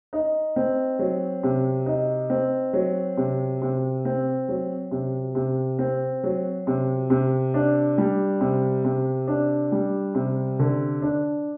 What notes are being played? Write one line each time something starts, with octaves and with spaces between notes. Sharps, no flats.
D#4
C4
F#3
C3
D#4
C4
F#3
C3
C3
C4
F#3
C3
C3
C4
F#3
C3
C3
D4
G3
C3
C3
D4
G3
C3
D3
D4